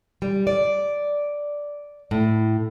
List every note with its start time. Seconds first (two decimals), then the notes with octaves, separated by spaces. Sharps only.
0.22 G3
0.47 D5
2.11 A2